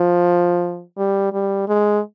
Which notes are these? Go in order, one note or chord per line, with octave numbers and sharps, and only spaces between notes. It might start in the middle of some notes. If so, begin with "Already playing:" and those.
Already playing: F3
G3
G3
G#3